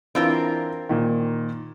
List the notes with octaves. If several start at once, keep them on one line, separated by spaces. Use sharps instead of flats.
E3 C4 D4 F4 A#4 E6
A#2 D#3